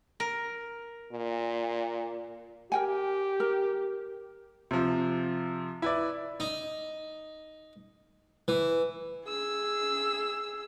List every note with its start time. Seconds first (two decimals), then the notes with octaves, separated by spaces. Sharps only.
0.20 A#4
1.12 A#2
2.72 G4 A#4 G5 G#5
3.40 A#4
4.71 C3 F3
5.82 E4 B4 D5
6.40 D#4
8.48 E3
9.27 G#4 E6